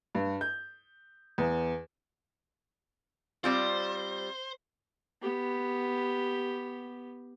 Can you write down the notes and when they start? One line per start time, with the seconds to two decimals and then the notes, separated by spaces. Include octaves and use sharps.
0.15 G2
0.41 G6
1.38 E2
3.44 G3 C4 F4 C5
5.22 B3 G4